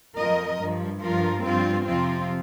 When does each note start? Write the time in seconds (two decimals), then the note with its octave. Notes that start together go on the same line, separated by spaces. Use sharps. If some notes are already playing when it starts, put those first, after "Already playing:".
0.16 F2 F3 A#4 D#5
0.60 G2 F3
1.02 G2 F3 F4 A#4
1.44 G2 F3 C4 F4
1.87 F2 C3 F3 C4 F4